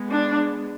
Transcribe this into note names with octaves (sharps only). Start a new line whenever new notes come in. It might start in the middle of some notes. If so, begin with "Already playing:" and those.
Already playing: G#3 B3
D4